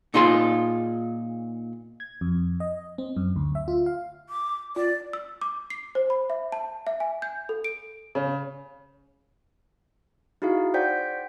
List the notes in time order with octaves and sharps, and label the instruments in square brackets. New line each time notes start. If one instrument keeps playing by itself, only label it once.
[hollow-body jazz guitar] A#2 D#4 F4 G#4 C6
[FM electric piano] G#6
F2
D#5
C4
F#2
D2
E5
F4
F5
[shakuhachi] D6
[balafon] F4 [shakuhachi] D5
[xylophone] E6
D6
C7
C5
B5
E5
A5
E5
G#5
G6
A4
D7
[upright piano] C#3
[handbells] D#4 E4 F#4 G#4 F5
C5 D5 F#5 G5 G6 B6